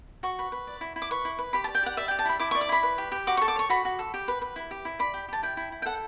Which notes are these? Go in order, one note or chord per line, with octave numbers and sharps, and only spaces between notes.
F#4 C#6
B4
B4
D5
E4
E4
D6
B4 C#6
E4
B4
G4 B5
A5
D5
G5
G4 F#5
D5 E5
G5
G4
A5
E4 B5
E4 D6
C#6
D5
D6
E4 B5
B4
G4
G4
F#4 D6
C#6
A4
D6
C#5 C#6
F#4 B5
F#4
A4
G4
B4
B4
E4
G4
E4
D5 B5
G4
G4 A5
E4 G5
E4
E4
G5
A4 F#5